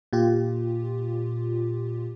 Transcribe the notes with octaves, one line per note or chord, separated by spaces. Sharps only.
A#2 F4 G4